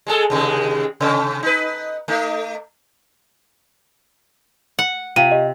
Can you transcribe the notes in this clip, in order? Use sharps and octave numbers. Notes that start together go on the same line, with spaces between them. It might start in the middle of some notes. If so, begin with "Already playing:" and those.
G#3 G#4 A4
D#2 C3 G#3
C3 C#4
D#4 B4
A3 D#4
F#5
C3 F4 F5 D#7
G4 D#5